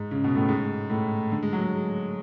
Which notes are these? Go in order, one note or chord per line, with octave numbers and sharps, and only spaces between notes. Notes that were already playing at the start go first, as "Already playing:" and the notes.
Already playing: G#2
C#3
B2
A2
G#2
A2
D3
G#3
F#3
G#3
G#3